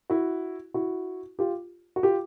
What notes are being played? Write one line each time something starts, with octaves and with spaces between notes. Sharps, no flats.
E4 F#4
E4 F#4
F4 G4
F#4
F4 G4